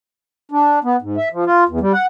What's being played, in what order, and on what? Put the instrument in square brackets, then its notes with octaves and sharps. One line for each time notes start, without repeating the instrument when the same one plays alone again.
[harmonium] D4
B3
G#2
E5
F3
F4
E2
G3
F#5